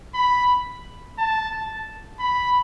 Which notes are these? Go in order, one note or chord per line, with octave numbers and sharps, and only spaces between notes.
B5
A5
B5